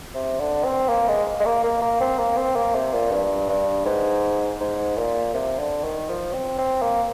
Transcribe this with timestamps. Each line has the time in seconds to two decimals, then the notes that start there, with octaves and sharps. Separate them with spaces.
0.14 C3
0.40 D3
0.64 C4
0.89 A#3
1.08 G#3
1.40 G#3
1.45 A#3
1.63 A#3
1.82 A#3
2.01 C4
2.19 A#3
2.37 C4
2.56 A#3
2.75 C3
2.93 A#2
3.11 G2
3.49 G2
3.85 G#2
4.60 G#2
4.97 A#2
5.34 C3
5.59 D3
5.84 D#3
6.09 F3
6.33 C4
6.58 C4
6.82 A#3